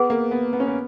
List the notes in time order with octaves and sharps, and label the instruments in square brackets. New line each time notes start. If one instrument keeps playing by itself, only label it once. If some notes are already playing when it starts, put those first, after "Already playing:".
Already playing: [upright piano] B3 [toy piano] G#4 B4 F#5
[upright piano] A#3
B3
B3
C#4
B3